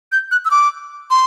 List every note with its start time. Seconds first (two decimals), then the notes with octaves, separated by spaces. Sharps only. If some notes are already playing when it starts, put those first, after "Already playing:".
0.12 G6
0.31 F#6
0.45 E6
0.51 D6
1.11 C6